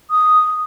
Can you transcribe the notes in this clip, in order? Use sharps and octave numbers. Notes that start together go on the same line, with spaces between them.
D#6